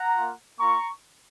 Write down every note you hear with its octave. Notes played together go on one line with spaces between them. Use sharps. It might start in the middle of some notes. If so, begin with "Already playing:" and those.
Already playing: F#5 A#5
F4
A#3
A#3 F4 A#5 C#6